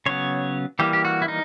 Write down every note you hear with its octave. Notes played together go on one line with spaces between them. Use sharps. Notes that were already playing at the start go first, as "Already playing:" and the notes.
C#3 F#3 B3 C#5
E3 G3 A#3 G4
G4
F#4
E4
D#4